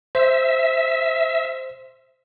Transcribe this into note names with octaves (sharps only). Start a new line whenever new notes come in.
C5 E5